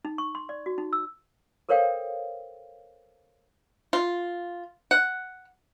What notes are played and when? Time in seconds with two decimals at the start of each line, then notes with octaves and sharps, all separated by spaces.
0.05 D#4
0.18 C#6
0.35 C6
0.49 D5
0.66 F#4
0.78 D#4
0.93 E6
1.69 A4 A#4 C5 C#5 F5 G5
3.93 F4
4.91 F#5